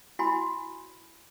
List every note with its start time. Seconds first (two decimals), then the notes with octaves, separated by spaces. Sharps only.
0.19 E4 F#4 G#5 B5 C6